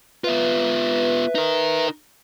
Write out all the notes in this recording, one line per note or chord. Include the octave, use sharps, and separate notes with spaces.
B3 F4 B4 E5
D#4 A#4